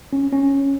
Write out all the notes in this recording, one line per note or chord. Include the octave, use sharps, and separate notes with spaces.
C#4
C#4